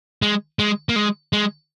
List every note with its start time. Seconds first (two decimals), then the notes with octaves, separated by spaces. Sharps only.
0.22 G#3
0.59 G#3
0.89 A#3
0.96 G#3
1.33 G#3